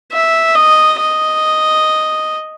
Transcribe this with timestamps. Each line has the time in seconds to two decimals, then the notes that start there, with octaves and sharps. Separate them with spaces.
0.12 E5
0.55 D#5
0.99 D#5